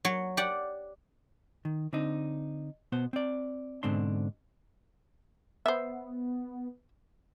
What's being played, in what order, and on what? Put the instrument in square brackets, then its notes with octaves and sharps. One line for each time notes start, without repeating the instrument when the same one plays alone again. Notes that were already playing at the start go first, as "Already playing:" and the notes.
[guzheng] F#3 C#5
G4 D5 F#5
[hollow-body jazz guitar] D#3
D3 C4 D#4
B2 B3 C5
C4 D5
G#2 B2 D3 C4 D4 C6
[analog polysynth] B3 [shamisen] C5 E5